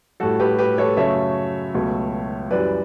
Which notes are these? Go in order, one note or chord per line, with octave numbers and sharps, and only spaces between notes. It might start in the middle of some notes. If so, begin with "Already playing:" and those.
A2 G3 F#4 A4
G4 B4
G4 B4
A4 C#5
F#2 C#3 F#3 A3 C#5 E5
C#2 B2 F#3 A3
F#2 E3 G3 B4 D5